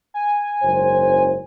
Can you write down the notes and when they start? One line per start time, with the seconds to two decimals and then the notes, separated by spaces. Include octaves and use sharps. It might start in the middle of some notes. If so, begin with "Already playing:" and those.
0.14 G#5
0.62 F#1 G#2 C5